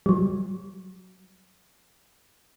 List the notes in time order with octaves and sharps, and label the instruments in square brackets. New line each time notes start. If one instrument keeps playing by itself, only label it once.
[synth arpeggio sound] F#3 G3